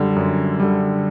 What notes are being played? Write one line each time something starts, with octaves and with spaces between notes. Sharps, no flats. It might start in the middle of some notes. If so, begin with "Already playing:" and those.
Already playing: F#2 D3 G3
F#2
D3 G3